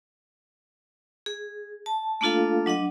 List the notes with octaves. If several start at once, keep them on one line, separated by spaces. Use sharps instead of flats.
G#4
A5
A3 A#3 D4 F4 A4 F5
F#3 D4 D#5 F#5